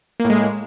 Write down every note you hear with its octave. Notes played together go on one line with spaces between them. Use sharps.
A2 G#3 A#3